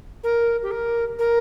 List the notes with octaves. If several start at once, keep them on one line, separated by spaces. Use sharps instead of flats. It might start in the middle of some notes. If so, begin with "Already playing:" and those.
A#4
G4
A#4
A#4